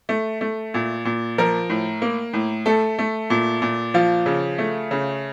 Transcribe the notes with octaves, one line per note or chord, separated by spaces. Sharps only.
A3
A3
A#2
A#2
F3 A#4
A2
A#3
A2
A3 A4
A3
A#2
A#2
F3 F4
C#3
A3
C#3